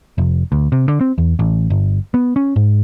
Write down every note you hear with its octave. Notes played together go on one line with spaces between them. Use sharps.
F1
D2
C3
D3
C4
E2
A1
G1
B3
C#4
G#2